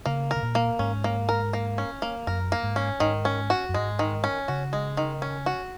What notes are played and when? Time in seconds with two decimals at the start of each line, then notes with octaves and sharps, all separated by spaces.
0.06 C#3 A#3
0.31 A#4
0.36 C#3
0.43 A#2
0.55 A#3
0.79 G#2 C#4
1.04 A#3
1.29 A#4
1.53 A#3
1.78 C#4
2.02 A#3
2.27 F#2 A#4
2.52 A#3
2.63 G#2
2.76 C#4
3.00 G#2 D#3
3.25 C#4
3.50 F#4
3.69 F#2
3.74 G#2 G#3
3.99 D#3
4.24 C#4
4.48 C#3 F#4
4.73 G#3
4.97 D#3
5.22 C#4
5.46 F#4